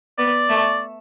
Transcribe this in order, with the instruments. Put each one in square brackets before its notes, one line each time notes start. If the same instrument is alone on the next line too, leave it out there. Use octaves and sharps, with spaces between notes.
[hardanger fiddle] B3 [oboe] D5
[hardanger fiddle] A3